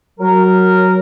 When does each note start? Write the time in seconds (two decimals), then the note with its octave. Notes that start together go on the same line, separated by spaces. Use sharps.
0.20 F#3 A#4